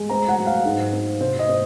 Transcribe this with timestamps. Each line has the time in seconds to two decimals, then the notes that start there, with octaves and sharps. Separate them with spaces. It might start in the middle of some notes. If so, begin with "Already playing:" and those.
Already playing: G#3
0.10 C4 A#5
0.29 F#5
0.38 F#3
0.46 F5
0.65 G#2
0.93 C4
1.21 C3 C5
1.39 D#5
1.49 C4